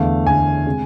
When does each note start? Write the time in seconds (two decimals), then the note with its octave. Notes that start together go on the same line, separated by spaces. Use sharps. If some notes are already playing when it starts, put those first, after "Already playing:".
Already playing: E2 D3 A3 F5
0.26 E2 D3 A3 G#5
0.66 C3 G#3